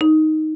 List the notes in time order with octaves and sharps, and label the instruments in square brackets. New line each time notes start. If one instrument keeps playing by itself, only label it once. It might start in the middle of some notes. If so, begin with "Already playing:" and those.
[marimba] D#4